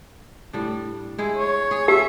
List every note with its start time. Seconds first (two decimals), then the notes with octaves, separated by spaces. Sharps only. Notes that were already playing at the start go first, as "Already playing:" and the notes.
0.53 A2 G3 D4
1.19 G#3 E4 G#4
1.36 C#5
1.71 G#4
1.88 C#4 G4 E5